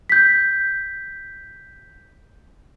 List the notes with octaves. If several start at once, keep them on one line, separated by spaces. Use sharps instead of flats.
G6 B6